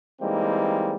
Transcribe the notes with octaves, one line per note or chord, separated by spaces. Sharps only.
E3 G3 G#3 A#3 C4 D#4